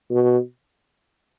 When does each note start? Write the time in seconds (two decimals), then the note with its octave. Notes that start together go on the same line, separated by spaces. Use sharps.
0.11 B2